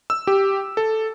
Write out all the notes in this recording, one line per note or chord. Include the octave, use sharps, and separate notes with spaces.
E6
G4
A4